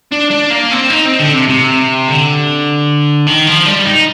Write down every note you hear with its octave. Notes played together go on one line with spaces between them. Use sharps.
D4
D4
A#3
C4
D#4
C4
D3
C3
C3
D3
D#3
F3
G3
D#4